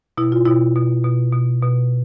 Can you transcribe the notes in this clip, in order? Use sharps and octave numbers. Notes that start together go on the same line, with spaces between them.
B2 E4
F4
B2 E4
B2
B2
B2
B2